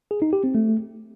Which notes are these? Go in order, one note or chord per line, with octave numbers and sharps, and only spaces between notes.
G#4
D#4
G4
C4
A3